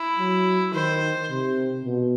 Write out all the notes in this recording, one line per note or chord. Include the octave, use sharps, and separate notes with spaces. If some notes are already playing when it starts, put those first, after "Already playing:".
Already playing: E4
F#3
D#3 C5
C3
B2